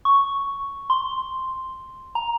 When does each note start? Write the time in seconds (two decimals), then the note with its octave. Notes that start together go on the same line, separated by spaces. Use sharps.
0.05 C#6
0.90 C6
2.15 A#5